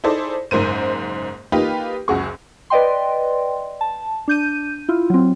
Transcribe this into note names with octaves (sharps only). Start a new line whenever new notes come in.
D#4 E4 G#4 A4 C5 D5
F#1 G#2 A#4 C5 D#7
A#3 D#4 F4 G4 B4
F#1 C#2 F#4 G#4 C#6
B4 D5 D#5 G5 C6
A5
D4 G6 D#7
E4 F4
F#3 C4